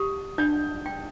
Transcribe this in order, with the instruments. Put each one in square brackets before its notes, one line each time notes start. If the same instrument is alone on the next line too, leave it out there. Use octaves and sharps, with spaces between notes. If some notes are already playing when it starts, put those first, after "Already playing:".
Already playing: [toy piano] G4 [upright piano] D#6
[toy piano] D4 [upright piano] G6
[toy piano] G5